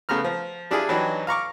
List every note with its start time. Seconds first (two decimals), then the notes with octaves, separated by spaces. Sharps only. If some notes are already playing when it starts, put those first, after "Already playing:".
0.09 C#3 A3 B3 A#5 F6
0.24 F3
0.71 G3 D4 E4 F4 G#4
0.89 E3 F#3 D4 D#4 G4
1.27 F5 A#5 C#6 D6